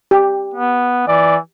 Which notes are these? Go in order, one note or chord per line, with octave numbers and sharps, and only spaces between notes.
G4
B3
E3 D5